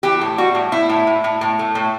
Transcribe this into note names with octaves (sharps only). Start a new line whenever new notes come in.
E3 G4
A2
G3 F#4
A2
A2 E4
A2
A2
A2
A2
A3
A2